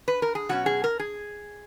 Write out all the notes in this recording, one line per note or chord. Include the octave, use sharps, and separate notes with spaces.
B4
A#4
G#4
B2 F#3 C#4 F#4
G#4
A#4
G#4